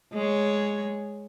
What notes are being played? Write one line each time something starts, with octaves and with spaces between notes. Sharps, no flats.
G#3 C#5